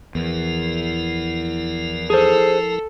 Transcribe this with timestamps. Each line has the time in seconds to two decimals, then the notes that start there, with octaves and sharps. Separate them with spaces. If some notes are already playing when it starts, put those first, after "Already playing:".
0.15 E2 F3 E4 A#4
2.10 G#4 A4 C5